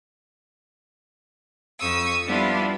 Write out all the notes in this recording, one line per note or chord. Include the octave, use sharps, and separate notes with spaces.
F2 C#6 D#6 E6
F3 G3 B3 D4 E4 F4